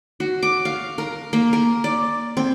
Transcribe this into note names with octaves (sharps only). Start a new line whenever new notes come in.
F#4
D6
F5
A#4
A#3
A#4
D5
C4